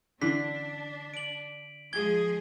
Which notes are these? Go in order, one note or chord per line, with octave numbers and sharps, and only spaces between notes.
D3 E3 C#4 D4 E4 B6
D7 F#7
F3 G#3 G#4 G#6 G7